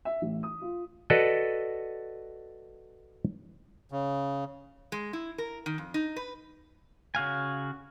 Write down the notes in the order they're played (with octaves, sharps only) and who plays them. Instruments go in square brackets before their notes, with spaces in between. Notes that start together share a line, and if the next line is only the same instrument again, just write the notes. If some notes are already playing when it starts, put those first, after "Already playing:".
[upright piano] E5
A1
D#6
F4
[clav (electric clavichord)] F#4 A4 B4 D5 D#5
[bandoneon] C#3
[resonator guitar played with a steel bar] G#3
E4
A#4
D#3
F2
D#4
B4
[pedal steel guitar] C#3 F#4 F5 G#5